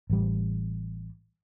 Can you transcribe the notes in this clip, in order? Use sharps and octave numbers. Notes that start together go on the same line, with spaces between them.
A1 G3